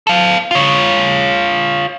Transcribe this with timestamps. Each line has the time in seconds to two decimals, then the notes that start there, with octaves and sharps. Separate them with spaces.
0.07 A4 F5
0.51 F4 C#5